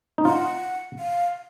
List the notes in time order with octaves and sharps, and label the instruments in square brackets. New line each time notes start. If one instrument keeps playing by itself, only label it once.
[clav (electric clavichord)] D#4
[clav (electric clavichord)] F4 [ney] F#5
[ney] F5